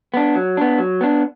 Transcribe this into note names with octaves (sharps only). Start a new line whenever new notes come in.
B3 D4
F#3
B3 D4
F#3
B3 D4